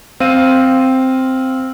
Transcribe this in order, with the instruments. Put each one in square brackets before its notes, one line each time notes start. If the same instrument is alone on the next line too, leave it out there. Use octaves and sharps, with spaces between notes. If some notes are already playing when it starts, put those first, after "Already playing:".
[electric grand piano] C4 F5 D#7